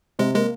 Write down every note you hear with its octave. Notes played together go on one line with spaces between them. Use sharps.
C3 G#3
G#3 A#3